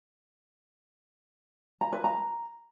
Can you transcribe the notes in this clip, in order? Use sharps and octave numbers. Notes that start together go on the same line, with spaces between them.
A#5
B4
A#5